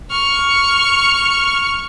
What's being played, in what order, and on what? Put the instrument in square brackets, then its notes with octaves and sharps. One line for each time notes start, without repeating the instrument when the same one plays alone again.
[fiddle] C#6 F6